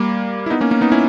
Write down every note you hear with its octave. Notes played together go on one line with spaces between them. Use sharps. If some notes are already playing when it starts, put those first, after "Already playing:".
Already playing: G3 A#3
E4
B3 D#4
A#3 C#4
A#3 C#4
B3 D#4
C#4 E4